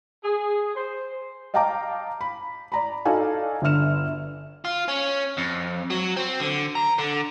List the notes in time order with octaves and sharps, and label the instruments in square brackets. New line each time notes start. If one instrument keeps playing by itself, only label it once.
[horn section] G#4
C5
[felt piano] D#5 F5 G5 A5 A#5 D6
B5
D5 A#5 B5
D#4 F#4 A4 D5 F5 G#5
G1 D3 E5 F6 E7
[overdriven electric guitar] F4
C#4
F2
F#3
C4
D3
A#5
D3